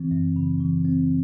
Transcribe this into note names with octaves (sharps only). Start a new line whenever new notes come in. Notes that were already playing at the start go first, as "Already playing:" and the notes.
Already playing: E3 C4
F#2
C#3
E3
C4